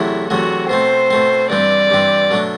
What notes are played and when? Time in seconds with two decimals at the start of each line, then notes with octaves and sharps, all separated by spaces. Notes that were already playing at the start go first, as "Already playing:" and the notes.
Already playing: E2 C3 F#3 A3 E4
0.30 E2 C3 F#3 A3 F#4
0.69 B2 A3 C4 C5
1.10 B2 A3 C4
1.50 G2 E3 G3 C4 D5
1.90 G2 E3 G3 C4
2.31 B2 F#3 A3 D4